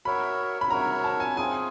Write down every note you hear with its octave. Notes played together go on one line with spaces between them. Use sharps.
F#4 A#4 C#5 E5 B5
B5
F#4 A#4 C#5 E5 A#5
A5
G#5
C4 F4 G#4 G#5